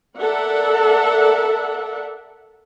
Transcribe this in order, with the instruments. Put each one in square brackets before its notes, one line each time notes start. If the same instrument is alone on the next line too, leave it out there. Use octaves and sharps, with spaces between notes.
[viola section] A4 A#4 D5 E5 F#5